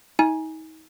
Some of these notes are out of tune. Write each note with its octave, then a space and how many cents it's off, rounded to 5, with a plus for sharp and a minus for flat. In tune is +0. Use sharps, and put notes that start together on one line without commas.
D#4 +35 G#5 +0